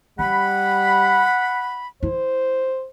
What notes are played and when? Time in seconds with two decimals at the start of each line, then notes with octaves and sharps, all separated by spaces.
0.19 G3 C#4 F#5 B5
2.03 E4 C5